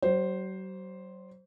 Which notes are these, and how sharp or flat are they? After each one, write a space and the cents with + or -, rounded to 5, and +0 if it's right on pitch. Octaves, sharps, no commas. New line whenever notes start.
F#3 +40 C5 +0